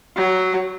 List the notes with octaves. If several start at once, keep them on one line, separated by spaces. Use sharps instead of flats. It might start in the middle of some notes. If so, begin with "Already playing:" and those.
F#3